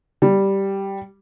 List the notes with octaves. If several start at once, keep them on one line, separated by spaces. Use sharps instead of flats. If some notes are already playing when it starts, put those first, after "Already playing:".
G3